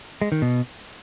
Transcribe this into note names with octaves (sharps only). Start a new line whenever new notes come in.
G#3
D#3
B2